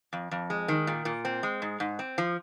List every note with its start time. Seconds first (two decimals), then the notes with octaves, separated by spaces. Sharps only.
0.13 F2
0.31 F2
0.50 G#3
0.68 D#3
0.87 A#2
1.05 A#2
1.25 C4
1.43 G#3
1.62 G#2
1.80 G#2
1.99 C4
2.18 F3